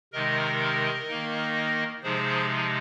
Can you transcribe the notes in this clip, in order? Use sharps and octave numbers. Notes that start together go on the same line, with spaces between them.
C3 D#3 G#3 D#4 A#4 D#5
D#3 A#3 D#4
C3 F3 G#3 D#4 G#4 C5